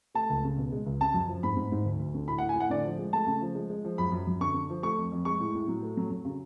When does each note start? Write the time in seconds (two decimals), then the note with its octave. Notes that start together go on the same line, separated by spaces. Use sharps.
0.15 A3 A5
0.30 C#2
0.44 C#3
0.58 B2
0.72 G#3
0.86 C#2
1.01 C#3 A5
1.14 F#2
1.28 F3
1.43 G#2 B5
1.56 G#2
1.72 G#2
1.85 D2
1.99 D2
2.14 D3
2.28 A2 B5
2.38 F#5
2.42 A2
2.49 G#5
2.56 A2 F#5
2.70 D3 D5
2.85 F3
2.98 G#3
3.13 A3 A5
3.27 C#3
3.41 F3
3.55 G#3
3.70 G#3
3.84 F3
3.98 F#2 B5
4.12 F#2
4.27 F#2
4.41 D3 C#6
4.54 D3
4.70 F3
4.83 A3 C#6
4.98 F2
5.12 F2
5.25 G#3 C#6
5.40 A2
5.55 A2
5.68 F#3
5.82 A3
5.97 F#3
6.11 F#3
6.25 C#3